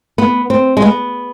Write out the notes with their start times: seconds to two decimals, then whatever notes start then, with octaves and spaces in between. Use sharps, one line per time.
0.18 B3
0.50 C4
0.77 G#3
0.82 B3